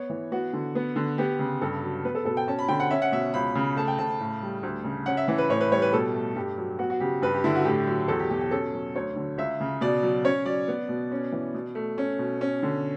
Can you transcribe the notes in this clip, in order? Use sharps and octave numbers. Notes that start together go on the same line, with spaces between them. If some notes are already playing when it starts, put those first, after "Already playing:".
Already playing: B3 C#5
E3
B3 F#4
D3
B3
D3
B3 G4
C#3
G2 A4
F#3
B3 B4
A4
B2 A4
G5
C#4 A5
B5
D3 G5
F#5
C#4 E5
F#5
B2 E5
C#2 B5
C#3
A3 A5
G5
C#3 A5
A2
G3
D2
C#3
C#4 F#5
E5
E3
B4
A2 C#5
B4
G3 C#5
B4
B2 A4
A3
G2 G4
F#3
B3 F#4
F#4
C#3 G4
G2 B4
G4
D3 E4
F#4
A2 G4
F#3
E2 A4
G4
B2 G4
G4
C#4 A4
F#3
D2 C#5
D3
C#2 E5
C#3
B2 D5
F#3
C#4 C#5
F#3 D5
B3
B2
C#4
E3
B2
A3
C#4
B2
C#4
D3